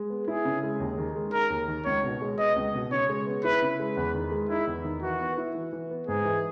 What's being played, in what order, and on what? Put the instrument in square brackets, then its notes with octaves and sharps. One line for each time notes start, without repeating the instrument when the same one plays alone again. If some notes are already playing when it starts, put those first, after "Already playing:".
Already playing: [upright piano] G#3
B3
[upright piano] E4 [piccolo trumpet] G#4
[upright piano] C#3
G#3
D#2
D#3
G#3
[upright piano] D#4 [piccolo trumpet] A#4
[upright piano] D#2
D#3
[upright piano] C#2 [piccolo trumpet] C#5
[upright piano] B2
G#3
[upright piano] B3 [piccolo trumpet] D#5
[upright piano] C#2
B2
[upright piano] C#3 [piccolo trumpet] C#5
[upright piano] G#3
B3
[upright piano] E4 [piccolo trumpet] B4
[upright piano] C#3
G#3
[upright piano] E2 [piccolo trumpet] B4
[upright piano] D#3
G#3
[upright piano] D#4 [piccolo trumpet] E4
[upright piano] E2
D#3
[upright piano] E3 [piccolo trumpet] F#4
[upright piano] B3
E4
E3
E3
B3
[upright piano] G#2 [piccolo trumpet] G#4
[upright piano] E3